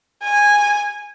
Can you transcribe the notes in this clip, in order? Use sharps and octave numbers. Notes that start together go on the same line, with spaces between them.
G#5